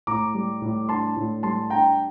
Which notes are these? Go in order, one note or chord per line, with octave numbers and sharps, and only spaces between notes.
A2 A#5 D6
G3
A2
D4 A5 C6
A2
G3 A5 C6
D4 G5 A#5